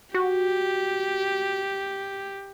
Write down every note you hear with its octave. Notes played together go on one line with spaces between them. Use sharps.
F#4 G4